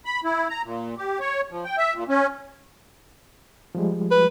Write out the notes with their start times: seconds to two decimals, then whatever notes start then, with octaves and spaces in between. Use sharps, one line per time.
0.05 B5
0.24 E4
0.50 A#5
0.64 A#2
0.98 G4
1.20 C#5
1.50 F3
1.65 G5
1.78 E5
1.94 A#2
2.09 C#4
3.75 F3 G3 G#3
4.11 B4